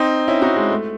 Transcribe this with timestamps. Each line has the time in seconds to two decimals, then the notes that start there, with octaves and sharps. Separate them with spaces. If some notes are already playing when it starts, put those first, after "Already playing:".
Already playing: C4 D#4
0.28 C#4 E4
0.42 D#4 F#4
0.56 G#3
0.71 A3